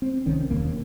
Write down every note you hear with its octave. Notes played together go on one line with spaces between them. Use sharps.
C4
C2 D#3 C#4
E1 D#2 A#3